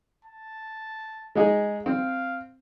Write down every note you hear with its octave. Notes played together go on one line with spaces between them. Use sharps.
A5
G#3 D#4 G#4
C4 F5